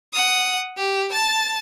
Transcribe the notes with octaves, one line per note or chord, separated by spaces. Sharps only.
F#5 D#6
G4
A5 A6